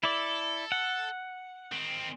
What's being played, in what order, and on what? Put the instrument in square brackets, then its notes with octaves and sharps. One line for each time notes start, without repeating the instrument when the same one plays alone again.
[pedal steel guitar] E4 D5 [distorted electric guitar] A4
[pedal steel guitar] F#5
[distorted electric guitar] D#3 C4